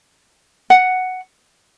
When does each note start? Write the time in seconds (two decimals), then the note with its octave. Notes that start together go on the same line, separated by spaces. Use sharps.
0.70 F#5